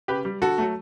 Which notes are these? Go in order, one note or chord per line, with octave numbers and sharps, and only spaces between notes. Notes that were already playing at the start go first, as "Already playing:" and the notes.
C#3 G4 B4
G3
D3 F#4 A4
F#3 A3